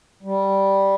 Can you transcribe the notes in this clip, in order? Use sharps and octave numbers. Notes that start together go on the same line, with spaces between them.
G3